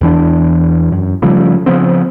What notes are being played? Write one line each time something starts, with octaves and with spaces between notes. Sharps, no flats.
E2 E3 D4
F#2
C#3 F3 G3 A3
C#3 F3 B3 C4